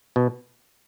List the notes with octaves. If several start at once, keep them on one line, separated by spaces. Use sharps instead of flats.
B2